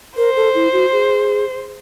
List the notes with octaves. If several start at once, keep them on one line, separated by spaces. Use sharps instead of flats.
A#4 C5
A4
E4
F#4
G#4